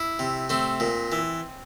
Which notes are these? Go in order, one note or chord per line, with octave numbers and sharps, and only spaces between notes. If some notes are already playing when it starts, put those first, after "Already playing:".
Already playing: E4
C3
A3 C4
A#2
E3